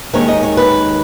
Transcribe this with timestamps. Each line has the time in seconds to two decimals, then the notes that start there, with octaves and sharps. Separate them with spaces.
0.13 D#2 D#3 G#3 C#4 C#5
0.28 D#5
0.43 C#5
0.57 B4